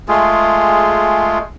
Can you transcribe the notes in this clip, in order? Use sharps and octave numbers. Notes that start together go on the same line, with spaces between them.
G#3 A3 F4 G#4